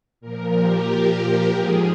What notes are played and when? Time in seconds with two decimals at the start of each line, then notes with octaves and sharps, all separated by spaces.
0.21 A#2 F3 A#4
0.56 G4
1.58 G#2 F3 G#4